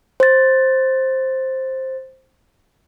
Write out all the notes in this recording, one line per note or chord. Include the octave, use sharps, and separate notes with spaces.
C5 A6